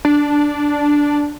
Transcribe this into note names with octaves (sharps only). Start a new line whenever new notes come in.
D4